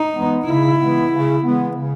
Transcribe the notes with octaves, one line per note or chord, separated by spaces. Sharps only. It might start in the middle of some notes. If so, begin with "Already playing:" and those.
Already playing: D#4
E3 G#3 B3
C#3 E4
E3 G#3 B3
C#3
E3 G#3 B3
C#3